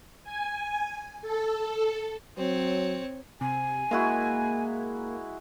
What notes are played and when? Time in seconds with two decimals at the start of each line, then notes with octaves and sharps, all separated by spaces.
0.24 G#5
1.22 A4
2.37 F#3 C4 C#5
3.41 C3 G#5
3.91 G#3 A#3 E4 F#4